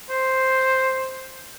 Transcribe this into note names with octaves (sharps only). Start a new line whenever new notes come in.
C5